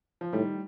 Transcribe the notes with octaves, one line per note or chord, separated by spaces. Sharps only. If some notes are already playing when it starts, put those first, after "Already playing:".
F3
A2 D#3 G3